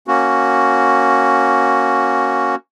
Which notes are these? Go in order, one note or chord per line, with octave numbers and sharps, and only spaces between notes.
A#3 C#4 F#4